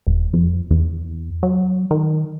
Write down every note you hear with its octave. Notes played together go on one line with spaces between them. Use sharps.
E1
F2
E2
F#3
D#3